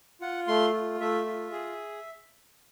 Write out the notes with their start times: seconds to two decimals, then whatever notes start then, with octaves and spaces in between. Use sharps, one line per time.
0.21 F4 F#5
0.48 A3 C6
0.73 F4
1.00 A3 E5
1.26 F4
1.52 G#4